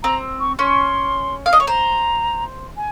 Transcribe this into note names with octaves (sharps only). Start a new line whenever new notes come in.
C4 A#5
C#6
C#4 C6
F5
D#5
C#5
C5 A#5
G#5